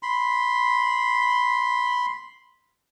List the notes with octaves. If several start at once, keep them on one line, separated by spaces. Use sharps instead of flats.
B5 C6